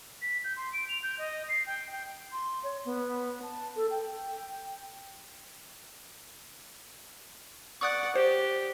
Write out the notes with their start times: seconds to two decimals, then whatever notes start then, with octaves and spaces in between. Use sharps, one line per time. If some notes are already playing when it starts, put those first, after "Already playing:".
0.22 B6
0.44 G6
0.57 C6
0.73 D7
0.89 F7
1.03 G6
1.19 D#5
1.49 C7
1.67 G5
1.92 G5
2.32 C6
2.64 C#5
2.85 B3
3.42 A5
3.76 A4
3.91 G5
7.81 D5 F#5 C#6 D#6 F#6
8.15 G4 C5